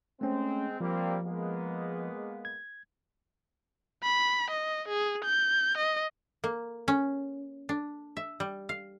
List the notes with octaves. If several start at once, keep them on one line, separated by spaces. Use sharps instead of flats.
G#3 A3 C4 C#4
F3 G3 A#3 C4
G#3 A#3 B3
G#6
B5
D#5
G#4
G6
D#5
A#3
C#4
D4
E5
G3
F5